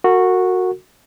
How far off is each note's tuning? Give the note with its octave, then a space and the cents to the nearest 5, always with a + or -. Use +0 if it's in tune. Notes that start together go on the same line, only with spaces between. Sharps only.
F#4 -10 A#4 -35